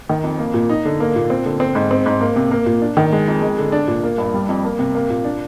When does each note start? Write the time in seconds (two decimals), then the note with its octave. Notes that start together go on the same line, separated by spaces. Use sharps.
0.09 D#3
0.23 F2
0.39 A#3
0.54 A#2
0.69 D#4
0.85 D3
1.00 A#3
1.16 A#2
1.30 C4
1.45 D3
1.60 C4
1.75 G#2
1.91 C4
2.06 G#2
2.21 A#3
2.36 C3
2.51 A#3
2.66 A#2
2.82 D4
2.97 D#3
3.12 G#3
3.28 F2
3.42 G#3
3.58 D3
3.72 D4
3.87 A#2
4.03 A#3
4.18 G2
4.34 G3
4.49 F2
4.64 A#3
4.79 C3
4.95 A#3
5.10 A#2
5.25 D4